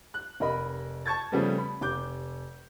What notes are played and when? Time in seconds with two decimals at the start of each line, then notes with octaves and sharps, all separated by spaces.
0.14 F#6
0.40 F1 A#4 D#5 B5
1.06 A5 C#6 G#6 A6
1.32 C#3 F3 G3 A3 B3 C#4
1.58 B5
1.81 F1 D6 G6